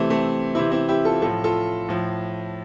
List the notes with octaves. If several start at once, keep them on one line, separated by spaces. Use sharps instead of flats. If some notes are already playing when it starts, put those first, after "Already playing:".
Already playing: C3 E3 A3 C4
A3 C4
C3 E3 C4 E4
C4 E4
E4 G4
F4 A4
A2 F3 F4 A4
F4 A4
A2 F3